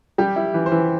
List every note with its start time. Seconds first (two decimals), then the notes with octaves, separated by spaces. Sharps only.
0.18 G3 G4
0.36 E4
0.54 E3
0.66 C5
0.72 E3